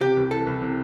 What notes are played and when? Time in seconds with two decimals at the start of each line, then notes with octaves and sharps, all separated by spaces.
0.01 C3 G4
0.17 C2
0.31 E3 A4
0.47 C2
0.62 C3